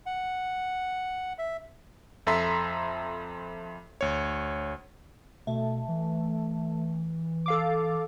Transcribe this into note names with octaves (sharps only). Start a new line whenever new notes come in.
F#5
E5
F2 A4 E5 A#5 C6 B6
D2 C#5
B2 A3
E3
A4 F5 D6